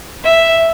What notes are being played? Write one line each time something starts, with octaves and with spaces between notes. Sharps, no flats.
E5